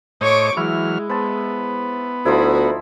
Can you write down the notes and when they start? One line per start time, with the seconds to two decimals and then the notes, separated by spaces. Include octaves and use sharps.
0.21 A2 C5 C#5 D#5 C#6 D6
0.57 E3 F#3 G#3 E4 F6
1.09 B3 C5 A5
2.25 D2 F3 D#4 E4 F#4